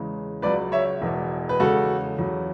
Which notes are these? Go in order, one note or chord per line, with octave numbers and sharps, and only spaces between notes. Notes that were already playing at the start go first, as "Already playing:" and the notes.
Already playing: E2 C#3 G#3
C#2 C#3 F#3 B4 D5
C#5 E5
E1 E2 B2
B4
E2 C#3 G#3 F#4 A4
E2 C#3 F#3